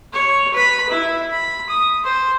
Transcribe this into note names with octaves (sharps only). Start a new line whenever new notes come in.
C#5
B4 B5
E4
B5
D#6
C5